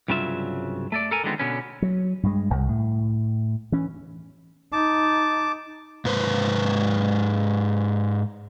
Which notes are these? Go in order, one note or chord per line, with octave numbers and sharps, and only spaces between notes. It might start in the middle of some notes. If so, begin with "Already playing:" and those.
C2 G2 C#3 F#3 F4 E5
A3 A4 D5
A4 A#4 G#5
D3 D#3 F3 G#3 B3 C4
B2 D3 B3 C#4
F#3
G2 G#3
D#1 C2
A2
E3 C#4
D#4 A5 D6
G#2 B4 C5